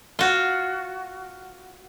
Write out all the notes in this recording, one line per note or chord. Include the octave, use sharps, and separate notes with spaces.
F4 F#4